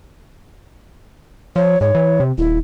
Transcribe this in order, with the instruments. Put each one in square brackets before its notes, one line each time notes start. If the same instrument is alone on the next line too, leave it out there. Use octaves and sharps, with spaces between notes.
[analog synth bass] F3 [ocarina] C#5
[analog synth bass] G#2 [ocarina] C#5
[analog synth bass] E3
C3
[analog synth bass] D#1 [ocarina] E4